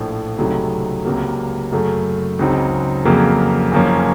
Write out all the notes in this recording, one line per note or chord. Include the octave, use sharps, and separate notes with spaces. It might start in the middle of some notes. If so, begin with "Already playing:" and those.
Already playing: A#1 A2 F3
C#2 C3 F#3 A3 D#4
C#2 C3 F#3 A#3
F#2 C#3 F#3 A3
C#2 C#3 F#3 C4 D#4
F2 C#3 F#3 A#3
F#1 F#2 F3 A#3 C#4